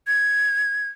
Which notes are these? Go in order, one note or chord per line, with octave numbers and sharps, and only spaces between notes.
G#6